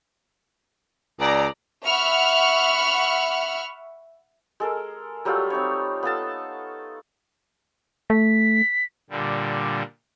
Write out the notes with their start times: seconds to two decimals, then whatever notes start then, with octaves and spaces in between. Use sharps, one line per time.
1.20 C#2 D5 A#5
1.86 E5 F#5 B5 C#6 F6
4.60 G#3 A4 A#4
5.25 F#3 G3 A3 F4
5.50 C4 D#4 C#5
6.03 B3 F4 A4 A5
8.10 A3 B6
9.10 A#2 D3 G3